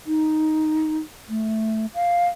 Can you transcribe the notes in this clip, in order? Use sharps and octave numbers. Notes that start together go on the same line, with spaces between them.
D#4
A3
F5